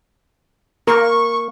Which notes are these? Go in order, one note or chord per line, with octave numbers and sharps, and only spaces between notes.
A#3 A#4 C#6